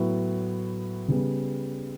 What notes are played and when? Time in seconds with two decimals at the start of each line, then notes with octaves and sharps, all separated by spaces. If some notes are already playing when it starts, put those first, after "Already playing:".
Already playing: A2 F#3 B3
1.08 C#3 G3 B3